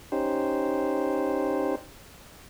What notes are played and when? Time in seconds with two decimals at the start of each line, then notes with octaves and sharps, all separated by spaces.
0.12 C#4 D#4 G4 C5